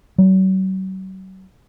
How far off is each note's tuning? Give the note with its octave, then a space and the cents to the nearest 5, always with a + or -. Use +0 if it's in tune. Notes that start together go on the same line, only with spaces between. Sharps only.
F#3 +40